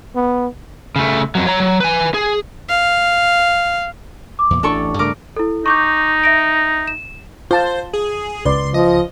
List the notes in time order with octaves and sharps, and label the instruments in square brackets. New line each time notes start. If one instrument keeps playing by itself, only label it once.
[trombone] B3
[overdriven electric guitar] C#3 A3
F2 F#3
C#5 A#5
F#3
B4 G#5
G#4
[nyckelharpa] F5
[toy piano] D6
[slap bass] E2 A#2
[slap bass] A1 [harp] D4 A4 C#6
[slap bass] G2 C#3 A3 [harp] A#4 D6
[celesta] E4 A4
[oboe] D#4 [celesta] C#6 D6 G6
[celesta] E5 A#6 D7
E7
[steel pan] F4 A5 [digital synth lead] C5
[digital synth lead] G#4
[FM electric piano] C#2 [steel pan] B4 D5 [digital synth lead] C6
[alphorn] F3 [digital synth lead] D#5